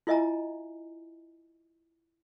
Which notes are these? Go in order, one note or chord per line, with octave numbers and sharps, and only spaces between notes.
E4 F4 D#5 E5 G#5 A#5